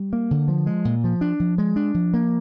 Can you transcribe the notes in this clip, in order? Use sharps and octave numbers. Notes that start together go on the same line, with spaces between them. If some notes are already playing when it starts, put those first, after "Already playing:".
Already playing: G3
A#3
D3
F3
G#3
A#2
F3
D4
F3
G#3
D4
F3
A#3